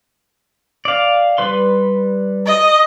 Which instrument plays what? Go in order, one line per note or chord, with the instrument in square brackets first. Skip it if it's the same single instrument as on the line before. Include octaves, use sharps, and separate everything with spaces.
[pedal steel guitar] D5 F5
G3 B4 C6
[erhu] D#5